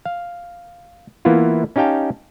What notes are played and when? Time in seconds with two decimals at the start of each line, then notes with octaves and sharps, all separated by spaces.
0.06 F5
1.25 E3 A#3 B3 E4 F4
1.76 C#4 D#4 G4 F5 G5 A5